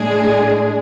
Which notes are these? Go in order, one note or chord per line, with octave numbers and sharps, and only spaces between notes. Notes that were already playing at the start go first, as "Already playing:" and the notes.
Already playing: A2 G#3 D4 G#4